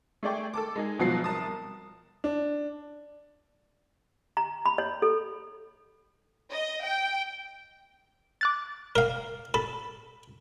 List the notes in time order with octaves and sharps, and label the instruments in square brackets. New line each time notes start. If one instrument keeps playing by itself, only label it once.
[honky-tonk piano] A3 G#4 D5 G5 C#6
A4 A5 D6
G#3 D#4 G#4
G1 C#2 B2 F3 F#3 C7
C2 A#4 A5 D#6
[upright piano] D4
[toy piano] A#5
B5
C#5
A4
[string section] D#5
G5
[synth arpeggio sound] D6 F#6 A6
[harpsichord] A#4 F5
[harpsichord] A4 [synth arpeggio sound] B5